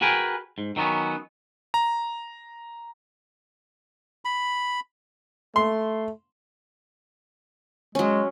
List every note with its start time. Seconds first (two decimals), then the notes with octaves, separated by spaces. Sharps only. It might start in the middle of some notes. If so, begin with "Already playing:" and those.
0.01 F#4 G#4 A#4 B4 G5 G#5
0.58 G#2
0.76 D#3 F#3 A3 B3 C#4
1.74 A#5
4.25 B5
5.56 A3 C6
7.95 F#3 G#3 C#4